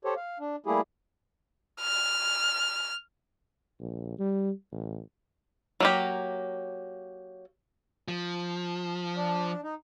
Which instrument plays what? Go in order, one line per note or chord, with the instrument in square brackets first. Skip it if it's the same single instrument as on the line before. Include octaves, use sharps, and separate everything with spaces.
[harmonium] G4 A4 C5 C#5
F5
D4
G3 A3 A#3 E4 G4 G#4
[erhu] F6
[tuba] A#1
G3
A1
[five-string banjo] F#3 A#3 G4
[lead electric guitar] F3
[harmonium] D4
D#4